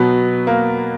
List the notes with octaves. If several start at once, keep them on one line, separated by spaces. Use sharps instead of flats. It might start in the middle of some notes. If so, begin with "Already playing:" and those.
Already playing: B2 F#3 B3
A#3